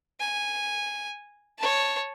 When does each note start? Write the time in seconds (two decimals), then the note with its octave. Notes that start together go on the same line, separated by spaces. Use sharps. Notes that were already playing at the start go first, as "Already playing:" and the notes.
0.19 G#5
1.58 C#5 A5